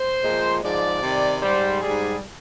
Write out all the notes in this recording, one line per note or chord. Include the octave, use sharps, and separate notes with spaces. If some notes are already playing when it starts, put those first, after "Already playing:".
Already playing: C5
A#2 F3 G#3
G#2 F3 G#3 D5
C3 D#3 G3
G#2 G3 C5
G#2 G3 G#4